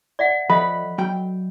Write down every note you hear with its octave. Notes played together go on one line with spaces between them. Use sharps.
D5 E5 F#5
F3 A4 D#5 E5 B5
F#3 G5